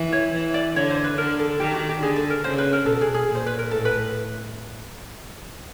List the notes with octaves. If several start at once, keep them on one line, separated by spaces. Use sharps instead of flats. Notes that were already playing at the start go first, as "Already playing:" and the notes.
Already playing: E3
C#5
E3
D5
D3 C#5
C5
B4
D3 A#4
A4
D#3 G4
F#4
G4
D3 G#4
A4
A#4
C#3 C5
B4
A#4
B2 A4
G#4
G#4
A#2
C5
B4
A#4
A2 A4
B4